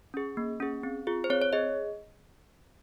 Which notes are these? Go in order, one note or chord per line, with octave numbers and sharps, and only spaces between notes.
C#4 G#4
A#3
C#4 G#4
C4
F4 G#4
C5
C4 C#5
C#5
G#4 D#5